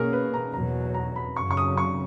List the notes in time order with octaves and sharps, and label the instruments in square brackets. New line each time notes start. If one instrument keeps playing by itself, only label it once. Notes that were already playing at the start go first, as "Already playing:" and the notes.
Already playing: [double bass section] B2 A#3 C#4 [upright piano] G#4 A#4
[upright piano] B4
A#5
[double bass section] E2 B2 F#3 [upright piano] A#5
[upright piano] A#5
B5
[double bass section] F#2 C#3 F#3 C#4 [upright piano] C#6
[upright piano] C#6
D#6
C#6